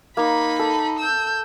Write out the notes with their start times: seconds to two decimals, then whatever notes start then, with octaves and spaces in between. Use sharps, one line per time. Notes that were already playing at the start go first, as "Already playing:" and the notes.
0.17 A#3 D#4 B5
0.59 A4
0.99 E6 G6